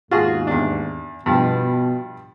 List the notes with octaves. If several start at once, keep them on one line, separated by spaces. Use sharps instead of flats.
D#2 G#2 B2 F4 F#4 G#4
E2 D4
G2 B2 F3